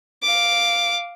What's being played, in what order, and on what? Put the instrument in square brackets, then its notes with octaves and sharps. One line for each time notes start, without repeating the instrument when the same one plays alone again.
[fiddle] F5 D6